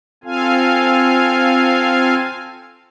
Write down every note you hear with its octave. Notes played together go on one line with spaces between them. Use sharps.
C4 F4 A4 F5 G#5